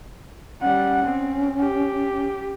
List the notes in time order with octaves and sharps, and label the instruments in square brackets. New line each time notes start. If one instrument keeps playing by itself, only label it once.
[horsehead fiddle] G3 F#5 [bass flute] C#4
[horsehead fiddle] C4
G4